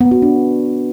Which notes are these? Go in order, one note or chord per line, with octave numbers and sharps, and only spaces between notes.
B3
F#4
D4